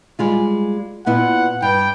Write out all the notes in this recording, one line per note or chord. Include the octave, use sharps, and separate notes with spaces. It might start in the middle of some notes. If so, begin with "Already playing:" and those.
G3 G#3 F4
A#2 B3 E4 F#5
G2 G5